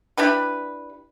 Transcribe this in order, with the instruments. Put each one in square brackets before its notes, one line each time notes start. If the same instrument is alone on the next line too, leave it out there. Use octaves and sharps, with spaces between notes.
[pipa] D4 E4 G4 B4